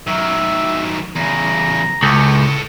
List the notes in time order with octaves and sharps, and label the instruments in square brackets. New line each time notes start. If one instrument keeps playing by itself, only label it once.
[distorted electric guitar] D#3 F#3 [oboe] E5
[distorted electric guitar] E2 C#3 [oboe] A#5
[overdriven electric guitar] C#2 [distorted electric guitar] A4 C#5